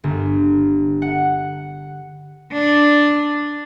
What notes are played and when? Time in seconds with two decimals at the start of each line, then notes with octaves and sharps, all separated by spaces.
0.04 G1
1.02 F#5
2.52 D4